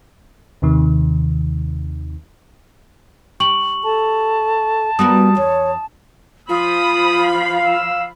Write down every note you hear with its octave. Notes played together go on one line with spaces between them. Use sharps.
D#2 C3 D#3
G4 C#6 F#7
A4 A5
G3 B3 F#4 A#4 D#6
E2 C#5
F3 F4 B5 D#6
F5
E6